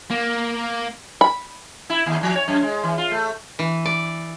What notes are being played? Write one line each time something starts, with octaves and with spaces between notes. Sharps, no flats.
A#3
B5
E4
D#2
F3
C#5
F#2
G#3
E3
F4
A3
E3
D5